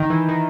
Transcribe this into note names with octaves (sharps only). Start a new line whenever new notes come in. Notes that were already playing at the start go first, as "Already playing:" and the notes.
Already playing: D#3
E3
D#3